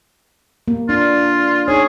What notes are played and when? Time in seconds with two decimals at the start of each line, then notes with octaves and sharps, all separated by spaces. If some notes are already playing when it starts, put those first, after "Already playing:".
0.68 A#3
0.89 D4 F4
1.68 D#4 G#4 C#5